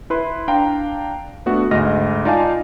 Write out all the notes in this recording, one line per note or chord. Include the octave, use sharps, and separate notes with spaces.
E4 B4 C6
D4 F5 G5 A#5
A3 B3 D4 F#4
D2 G#2 D#5 F6 A#6
D#4 F4 D5 F5 G#5 A5